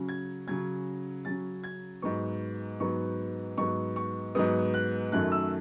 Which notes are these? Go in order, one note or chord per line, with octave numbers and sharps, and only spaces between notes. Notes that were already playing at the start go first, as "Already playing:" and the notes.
Already playing: C#3 F#3 C#4
G#6
C#3 F#3 C#4 G#6
C#3 F#3 C#4 A6
G#6
G#2 F#3 B3 C#6
G#2 F#3 B3 C#6
G#2 F#3 B3 C#6
C#6
G#2 F#3 B3 D#6
F#6
F#2 D#3 F#3 A3 F#6
E6